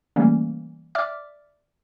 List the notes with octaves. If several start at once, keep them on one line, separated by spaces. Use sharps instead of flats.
C#3 E3 G3 A3 A#3 C#4
D5 E5 D6 F6